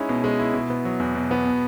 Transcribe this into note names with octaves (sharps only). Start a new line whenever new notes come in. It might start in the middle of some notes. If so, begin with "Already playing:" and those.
Already playing: G#3 C#4 D#4 E4
B2
G#3
E4
B2
B3
F#3
E2
B2
B3
B2